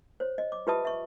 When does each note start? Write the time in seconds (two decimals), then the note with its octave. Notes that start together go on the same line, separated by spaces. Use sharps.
0.20 C5 C#5
0.38 D#5
0.52 D6
0.67 F4 G4 B4 E5 A5 D#6
0.85 E5 C#6